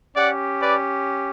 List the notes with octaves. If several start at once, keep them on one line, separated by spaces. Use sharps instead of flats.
C#4 G4 D5 F#5
B4 D5